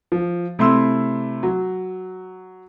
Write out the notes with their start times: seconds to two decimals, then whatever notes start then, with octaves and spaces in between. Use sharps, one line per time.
0.12 F3
0.59 C3 A3 E4 C6 E6
1.43 F#3